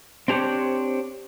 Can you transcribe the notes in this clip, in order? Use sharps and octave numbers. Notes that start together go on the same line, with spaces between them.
C4 D4 G4 G#4 C5 C#5